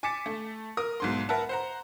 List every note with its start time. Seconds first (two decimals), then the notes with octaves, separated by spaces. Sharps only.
0.03 G#5 D6 A6 B6 C#7 E7
0.26 A3
0.77 A#4 D#6
1.00 B1 G#2 C6
1.29 A#4 B4 E5 F#5 A5
1.49 C5 F#5 A#5